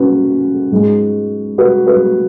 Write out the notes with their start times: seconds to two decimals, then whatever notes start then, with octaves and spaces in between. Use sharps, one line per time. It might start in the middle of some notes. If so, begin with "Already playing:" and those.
Already playing: C#4 F#4 B4
0.71 G#2 G#3
1.58 F#4 B4
1.87 F#4 B4